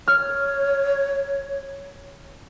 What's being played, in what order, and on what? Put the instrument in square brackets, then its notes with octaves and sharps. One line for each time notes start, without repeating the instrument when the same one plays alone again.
[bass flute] C#5 [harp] F6